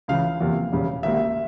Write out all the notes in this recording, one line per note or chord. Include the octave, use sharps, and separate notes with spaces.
C#2 C#3 E3 F5
E2 C3 F3 A#3
E1 E2 C#3 G3
G#1 G#2 G3 A#3 E5